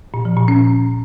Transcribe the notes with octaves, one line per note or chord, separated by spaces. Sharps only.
A#2
F3
A#2
C#4